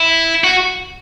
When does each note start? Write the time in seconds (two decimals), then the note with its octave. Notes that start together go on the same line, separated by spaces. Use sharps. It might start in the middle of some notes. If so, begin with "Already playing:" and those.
Already playing: E4
0.44 F#4